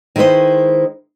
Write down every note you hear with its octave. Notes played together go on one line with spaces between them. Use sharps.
D#3 G#3 E4 B4 C5 D#5